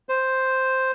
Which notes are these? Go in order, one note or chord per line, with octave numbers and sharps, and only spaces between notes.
C5